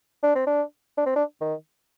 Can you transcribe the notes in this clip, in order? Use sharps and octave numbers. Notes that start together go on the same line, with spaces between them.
D4
C4
D4
D4
C4
D4
D#3